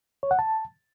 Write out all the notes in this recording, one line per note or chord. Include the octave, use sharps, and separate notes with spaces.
C#5
F#5
A5